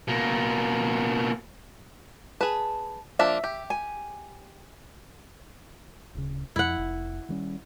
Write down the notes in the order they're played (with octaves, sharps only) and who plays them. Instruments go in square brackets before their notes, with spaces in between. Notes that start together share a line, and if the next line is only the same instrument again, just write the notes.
[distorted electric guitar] B2 A#3
[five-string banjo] G#4 B4 [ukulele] A5
[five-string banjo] F3 A#3 D4 [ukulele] E5
[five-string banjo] G4
[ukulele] G#5
[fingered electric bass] D1 C#3
[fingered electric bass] F2 [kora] E4 F#5
[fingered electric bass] F1
D#3 G3 C#4